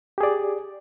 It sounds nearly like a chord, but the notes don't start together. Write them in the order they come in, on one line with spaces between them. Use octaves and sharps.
G4 G#4 D5